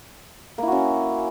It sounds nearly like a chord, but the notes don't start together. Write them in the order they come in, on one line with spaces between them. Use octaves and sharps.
A#3 E4 F#4 C#4